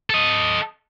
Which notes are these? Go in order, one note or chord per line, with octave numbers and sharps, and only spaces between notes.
A4 D#5